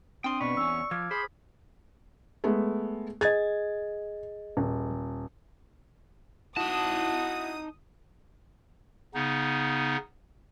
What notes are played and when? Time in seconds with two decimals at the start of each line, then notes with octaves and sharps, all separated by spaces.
0.24 C4 D4 G5 C6 D#6
0.41 B2 B4 D5 C#6
0.57 E2 C#4 E6
0.91 F3 D6 F6 G#6
1.11 G#4 C5 B5 D#6
2.44 G#3 A3 B3
3.21 G#4 D#5 G#6 A6
4.57 D#1
6.57 D#4 E4 F#4 A5 D#6
9.14 C#3 B3 D#4